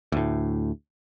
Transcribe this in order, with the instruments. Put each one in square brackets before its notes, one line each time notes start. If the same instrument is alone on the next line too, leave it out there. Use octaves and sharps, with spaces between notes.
[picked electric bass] D2 A2